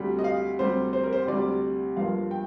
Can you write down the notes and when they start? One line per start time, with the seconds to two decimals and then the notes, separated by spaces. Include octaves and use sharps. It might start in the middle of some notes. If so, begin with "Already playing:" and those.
Already playing: D2 C3 G3
0.19 D#5
0.24 F5
0.59 D2 C3 G3 C5
0.93 C5
1.04 A#4
1.13 C5
1.28 D2 C3 G3 D5
1.96 G1 G2 F3 A#3 F5
2.31 G5